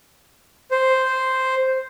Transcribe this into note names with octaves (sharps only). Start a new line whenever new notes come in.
C5